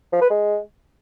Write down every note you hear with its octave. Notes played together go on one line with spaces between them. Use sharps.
F3
B4
G#3